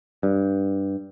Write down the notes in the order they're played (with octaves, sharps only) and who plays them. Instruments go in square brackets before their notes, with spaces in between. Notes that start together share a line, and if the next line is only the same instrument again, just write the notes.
[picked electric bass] G2